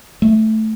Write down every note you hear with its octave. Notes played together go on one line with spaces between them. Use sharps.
A3